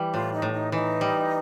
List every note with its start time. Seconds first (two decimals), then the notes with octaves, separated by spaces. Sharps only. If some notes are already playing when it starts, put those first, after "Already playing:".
Already playing: E3 G3
0.14 A2 F4
0.33 D#4
0.42 A2
0.52 D#4
0.72 E3 D#4
1.01 G3